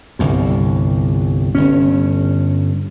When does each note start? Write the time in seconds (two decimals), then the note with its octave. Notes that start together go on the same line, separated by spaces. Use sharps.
0.19 G1 C2 G2
1.55 G1 G2 C#4